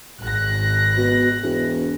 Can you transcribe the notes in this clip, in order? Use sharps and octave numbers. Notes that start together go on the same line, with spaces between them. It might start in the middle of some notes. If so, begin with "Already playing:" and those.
G#1 F#6 A#6
B2
E1